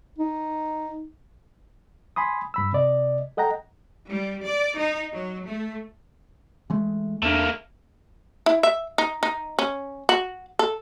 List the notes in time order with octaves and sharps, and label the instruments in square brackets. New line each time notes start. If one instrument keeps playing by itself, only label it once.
[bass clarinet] D#4
[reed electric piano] G#5 B5 C6 D#6
G2 B5 E6
C3 D5 D#5
A4 D#5 F#5 G5 A#5
[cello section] G3
D5
D#4
F#3
A3
[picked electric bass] E3 G#3 A3
[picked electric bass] E2 D4 [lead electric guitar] A3 A#3
[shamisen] E4
E5
D#4
D#4
C#4
F#4
A4